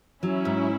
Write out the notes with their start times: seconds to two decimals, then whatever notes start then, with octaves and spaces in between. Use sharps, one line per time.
0.23 F#3 C#4 E4
0.45 G#2